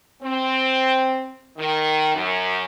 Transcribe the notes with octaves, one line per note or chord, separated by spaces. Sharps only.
C4
D#3
F#2